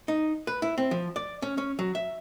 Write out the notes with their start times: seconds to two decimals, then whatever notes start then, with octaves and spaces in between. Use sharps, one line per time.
0.08 D#4
0.47 B4
0.62 E4
0.78 C4
0.91 F3
1.16 D5
1.42 C#4
1.58 C#4
1.79 F#3
1.95 E5